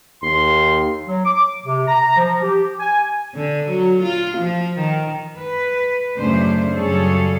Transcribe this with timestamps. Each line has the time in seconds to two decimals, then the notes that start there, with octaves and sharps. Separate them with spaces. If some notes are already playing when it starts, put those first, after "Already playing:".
0.23 D#2 C6
1.07 F#3
1.25 D6
1.65 C3
1.87 A#5
2.16 F3
2.42 G4
2.79 G#5
3.35 D3
3.70 F#3
4.03 F4
4.38 F3
4.79 D#3
5.38 B4
6.16 F#2 A2 C#3 A3 D4 C5
6.75 F#2 C#3 G3 G#4 A4 C#5